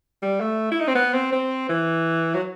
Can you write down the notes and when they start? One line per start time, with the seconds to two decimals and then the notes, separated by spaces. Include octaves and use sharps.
0.23 G3
0.40 A3
0.72 E4
0.80 D#4
0.88 C4
0.95 B3
1.13 C4
1.32 C4
1.69 E3
2.35 F#3